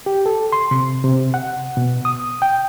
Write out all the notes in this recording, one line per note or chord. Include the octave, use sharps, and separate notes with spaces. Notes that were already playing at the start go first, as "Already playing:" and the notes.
G4
A4
C6
C3
C3
F#5
B2
D#6
G5